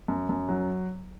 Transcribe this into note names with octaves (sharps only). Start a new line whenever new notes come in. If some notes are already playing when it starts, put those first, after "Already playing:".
F#2
F#2
F#3